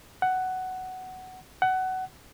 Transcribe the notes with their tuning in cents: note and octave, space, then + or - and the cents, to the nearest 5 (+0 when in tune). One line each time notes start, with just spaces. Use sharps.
F#5 +10
F#5 +20